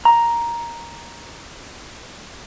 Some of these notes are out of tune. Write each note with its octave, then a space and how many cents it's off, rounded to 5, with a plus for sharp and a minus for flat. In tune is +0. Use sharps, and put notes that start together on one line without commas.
A#5 +5